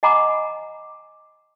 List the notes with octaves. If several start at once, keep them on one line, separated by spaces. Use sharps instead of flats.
D#5 F#5 G#5 A#5 B5 D6